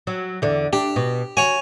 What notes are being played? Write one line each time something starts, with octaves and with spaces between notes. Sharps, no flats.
F#3
E2 D3
D4 G4
B2
F#4 C#5 G#5